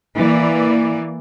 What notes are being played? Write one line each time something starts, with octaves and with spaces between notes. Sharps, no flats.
E3 A#3 D5